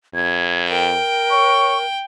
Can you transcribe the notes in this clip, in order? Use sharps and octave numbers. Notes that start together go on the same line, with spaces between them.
F2 G#6
A#4 G5
C#5 C#6